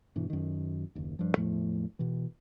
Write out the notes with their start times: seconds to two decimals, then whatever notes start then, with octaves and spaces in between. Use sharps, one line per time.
0.16 G2 B2 E3
0.30 F#2 D#3
0.95 F#1 D#2
1.19 G2 F3
1.37 E2 A2 F3 A3
1.99 B2 E3